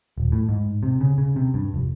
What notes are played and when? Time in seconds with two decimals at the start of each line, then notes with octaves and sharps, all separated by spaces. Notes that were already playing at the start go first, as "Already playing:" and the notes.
0.18 D#1
0.32 A2
0.49 G#2
0.83 C3
1.01 C#3
1.18 C#3
1.36 C3
1.54 G2
1.74 F1